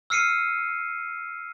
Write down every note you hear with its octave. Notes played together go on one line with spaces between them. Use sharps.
E6 F6 C7 C#7 D#7